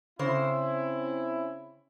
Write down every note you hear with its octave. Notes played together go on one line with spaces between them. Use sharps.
C#3 C4 C#4 E4 C5